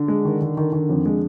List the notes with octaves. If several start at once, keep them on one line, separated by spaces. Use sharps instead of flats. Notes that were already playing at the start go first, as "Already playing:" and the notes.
Already playing: D3
G#3
D#3
D#3
D#3
D#3
F2
G#3